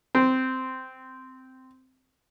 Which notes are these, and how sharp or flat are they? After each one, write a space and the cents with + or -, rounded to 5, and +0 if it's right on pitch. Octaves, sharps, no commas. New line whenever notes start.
C4 -10